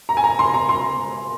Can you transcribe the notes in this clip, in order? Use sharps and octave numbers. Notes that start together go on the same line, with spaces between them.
A#5
G#5
A#5
C6
A#5
C6